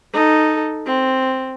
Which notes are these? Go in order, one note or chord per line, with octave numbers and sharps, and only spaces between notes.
D#4 A4
C4